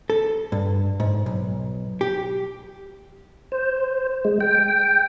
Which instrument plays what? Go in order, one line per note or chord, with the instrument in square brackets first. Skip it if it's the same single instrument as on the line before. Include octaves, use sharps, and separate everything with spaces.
[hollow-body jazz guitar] A4
G2
G#2
B1
G4
[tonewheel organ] C5
G#3
G5